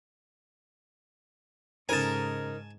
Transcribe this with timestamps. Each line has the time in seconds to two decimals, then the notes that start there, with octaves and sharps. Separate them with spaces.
1.89 G#2 C#3 D#4 A4 A#4 C5 G#5 A5